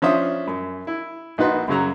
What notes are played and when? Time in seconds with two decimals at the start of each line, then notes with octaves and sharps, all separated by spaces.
0.02 F3 C#4 D4 C5 E5 D#6
0.47 F#2
0.87 E4
1.38 A#1 D#4 F#4 B4 C6
1.68 F#2 C#3 F#3 A#5